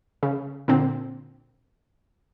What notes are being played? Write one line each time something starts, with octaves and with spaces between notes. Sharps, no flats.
C#3
A#2 D3 C4